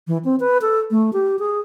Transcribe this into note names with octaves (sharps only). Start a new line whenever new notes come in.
E3
C4
B4
A4
A3
G4
G#4